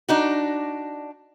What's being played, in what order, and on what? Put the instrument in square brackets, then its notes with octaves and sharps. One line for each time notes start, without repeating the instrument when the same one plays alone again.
[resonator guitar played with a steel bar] D4 D#4 F#4